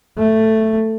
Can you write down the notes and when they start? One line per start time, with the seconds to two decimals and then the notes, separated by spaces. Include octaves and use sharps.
0.18 A3